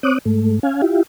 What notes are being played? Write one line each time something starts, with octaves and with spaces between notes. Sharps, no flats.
C4 C#5 D6 D#6 F#6
G#2 A3
C#4 F5 G#5
E4 F4 G4